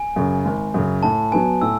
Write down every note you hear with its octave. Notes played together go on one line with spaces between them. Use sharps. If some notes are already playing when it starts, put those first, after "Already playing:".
Already playing: G#5
F#2 C#3
G#1
F#2 C#3
A2 A5
F#3 B3 G#5
A2 E6